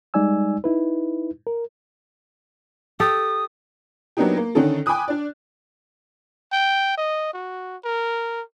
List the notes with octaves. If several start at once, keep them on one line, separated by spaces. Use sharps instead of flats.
G3 G#3 D#4 D5 G#5 E6
D#4 E4 B4
A#4
G4 A4 D#6
F#3 A#3 B3 D4 D#4 G4
A#3
D3 D#3 C#4 D#4 A4
G5 G#5 B5 D6 D#6 F#6
D4 D5
G5
D#5
F#4
A#4